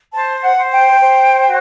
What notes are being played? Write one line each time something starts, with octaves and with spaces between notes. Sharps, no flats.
C5 A5
F#5
C5
G5
C5
F#4